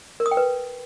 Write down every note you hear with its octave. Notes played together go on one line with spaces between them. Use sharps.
A#4
D#6
G5
B4